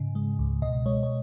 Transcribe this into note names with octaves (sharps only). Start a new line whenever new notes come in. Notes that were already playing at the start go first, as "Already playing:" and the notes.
Already playing: G#2 C#3
G#3
C#2
B2 D#5
G#3 C#5
C#5